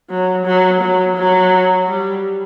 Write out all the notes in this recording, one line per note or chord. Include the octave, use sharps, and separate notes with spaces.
F#3
F#3
F#3
F#3
G3